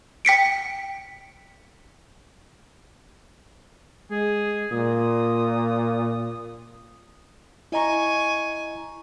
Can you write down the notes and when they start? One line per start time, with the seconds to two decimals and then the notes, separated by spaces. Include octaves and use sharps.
0.25 G5 B6 C#7 D7
4.11 G#3 G#4
4.72 A#2 D#6
7.72 E4 D#5 G#5 A#5 C#6